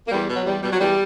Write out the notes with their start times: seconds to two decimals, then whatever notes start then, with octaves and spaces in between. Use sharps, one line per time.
0.07 A#3
0.10 E2 G3
0.28 B2
0.34 F#3
0.45 E2 G3
0.62 B2 G3
0.72 F#3
0.79 E2 G3